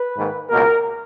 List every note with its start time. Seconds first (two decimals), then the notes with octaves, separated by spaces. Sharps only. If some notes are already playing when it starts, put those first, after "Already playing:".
Already playing: B4
0.17 G#2 D#3 A#3
0.50 C#2 B2 A#3 A#4